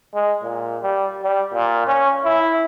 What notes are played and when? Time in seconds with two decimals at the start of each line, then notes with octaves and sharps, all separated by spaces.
0.14 G#3
0.43 A#2
0.82 G3
1.23 G3
1.54 A#2
1.87 C#4
2.24 E4